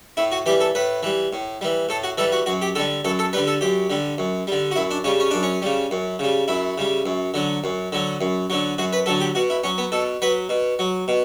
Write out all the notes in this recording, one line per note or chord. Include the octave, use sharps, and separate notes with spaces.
A2 E4
F#4
E3 G3 G4
A4
A2 B4
E3 G3
A2
E3 G3
A2 A4
F#4
E3 G3 A4
F#4
F#2 F#4
G4
D3 G3 A4
F#2 A4
A4
D3 G3 B4
A4
F#2 G4
D3 G3
F#2
D3 G3
F#4
F#2 E4
D4
C#3 G3 C#4
C#4
F#2 D4
C#4
C#3 G3
F#2
C#3 G3
F#2 E4
C#3 G3
F#2
D3 F#3
F#2
D3 F#3
F#2
D3 F#3
F#2 F#4
B4
D3 F#3 A4
G4
B2 F#4
E4
F#3 C#4
B3
B2 A4
F#3 B4
B2
F#3
B2